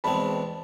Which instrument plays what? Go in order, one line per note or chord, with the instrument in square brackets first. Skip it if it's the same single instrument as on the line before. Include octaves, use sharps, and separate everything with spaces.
[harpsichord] E2 B2 G#3 C4 [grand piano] A5 B5